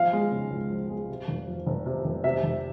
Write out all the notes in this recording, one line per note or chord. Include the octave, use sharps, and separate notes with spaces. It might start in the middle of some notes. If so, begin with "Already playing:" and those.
Already playing: F3 F5
G#3
C#3
C#2
F3
G#3
C3
F1
F2
F1
C3
F1
C3 E5
F1